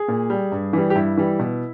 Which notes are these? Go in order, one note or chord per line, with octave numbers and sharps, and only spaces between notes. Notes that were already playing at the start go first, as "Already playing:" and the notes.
Already playing: G#4
A#2
G3
G2
E3 G3
G4
G2 E4
E3 G3
B2